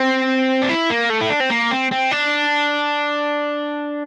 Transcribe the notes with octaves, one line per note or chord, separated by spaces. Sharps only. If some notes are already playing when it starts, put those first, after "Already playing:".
Already playing: C4
D4
E4
A#3
A3
E4
D4
C4
A#3
C4
C4
D4